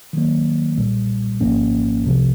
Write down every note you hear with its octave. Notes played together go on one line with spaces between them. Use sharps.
D#3 F#3 A#3
B1 A#2 G3
G#1 G#2 F3 A#3 C#4
C2 C3 F3